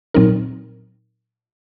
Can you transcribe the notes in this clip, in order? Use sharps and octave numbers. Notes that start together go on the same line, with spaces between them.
A#2 F#3 C4 D#4 A#4